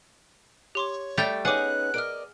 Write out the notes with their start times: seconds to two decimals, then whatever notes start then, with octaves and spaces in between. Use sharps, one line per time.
0.75 G4 C#5 C6 D6
1.18 G3 A3 D5 G5 G6 F7
1.45 B3 C#4 D#4 G#4 F#5 G#5 D6 F#6
1.94 A#4 D5 D#5 F6 D7